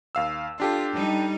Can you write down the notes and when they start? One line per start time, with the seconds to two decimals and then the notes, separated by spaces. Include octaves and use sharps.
0.15 D#2 F5 E6
0.60 D4 F4 G4 A4
0.93 G3 D#4